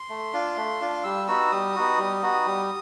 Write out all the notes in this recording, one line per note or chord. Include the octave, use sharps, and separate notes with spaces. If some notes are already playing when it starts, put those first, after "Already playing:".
Already playing: C6
A3
D4 F4
A3
D4 F4
G3 E6
B3 D#4 F#4 E6
G3 D#6
B3 D#4 F#4
G3
B3 D#4 F#4
G3